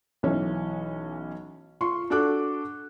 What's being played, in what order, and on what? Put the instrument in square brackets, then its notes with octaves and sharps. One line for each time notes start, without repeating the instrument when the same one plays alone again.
[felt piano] B1 E3 C#4
F4 C6 C#6
D4 F#4 A4 D6 F#6